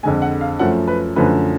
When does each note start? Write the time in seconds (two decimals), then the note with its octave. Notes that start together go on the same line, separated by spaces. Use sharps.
0.03 F2 D3 G#3 G#5
0.22 F#5
0.41 F5
0.59 F#2 F3 A3 F#5
0.87 B4
1.16 F#2 D3 F3 A3 B4